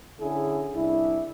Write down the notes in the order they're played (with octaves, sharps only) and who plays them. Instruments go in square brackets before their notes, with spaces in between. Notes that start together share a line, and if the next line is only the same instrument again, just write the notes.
[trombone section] D3 C#4 E4 G#4
C2 D4 E4